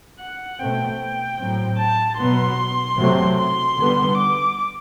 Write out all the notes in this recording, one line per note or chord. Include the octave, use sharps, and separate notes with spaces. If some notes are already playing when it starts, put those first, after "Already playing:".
F#5
B2 A3 C4 G5
A2 F#3 C4
A5
B2 F#3 B3 C6
C3 F#3 A3 C4
C6
D3 G3 B3
D6